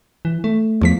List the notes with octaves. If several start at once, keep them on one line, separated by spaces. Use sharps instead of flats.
E3
A3
E2 F3 B6